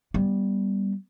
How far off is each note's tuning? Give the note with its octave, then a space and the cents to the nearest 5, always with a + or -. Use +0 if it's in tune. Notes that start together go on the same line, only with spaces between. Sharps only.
G3 +0 B3 -20